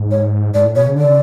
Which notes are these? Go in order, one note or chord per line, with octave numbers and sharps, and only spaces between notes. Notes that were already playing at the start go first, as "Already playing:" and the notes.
Already playing: G#2
C#5
G#2 D5
A2
B2 C#5
C#3
D3 D5
C#3